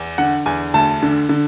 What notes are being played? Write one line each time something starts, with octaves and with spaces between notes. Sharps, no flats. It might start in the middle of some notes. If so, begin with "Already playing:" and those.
Already playing: E2
D3 F#5
E2 G#5
D2 A5
D3
D3